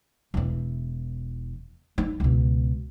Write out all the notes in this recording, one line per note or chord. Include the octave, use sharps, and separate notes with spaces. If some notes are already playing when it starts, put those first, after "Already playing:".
E1 E3
D#4
C#2 B2